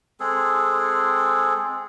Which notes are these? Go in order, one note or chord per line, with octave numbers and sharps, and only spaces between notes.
G#3 C4 G#4 A4